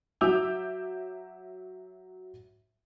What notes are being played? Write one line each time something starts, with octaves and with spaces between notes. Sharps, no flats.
F#3 E5 D6 E6 G6 F7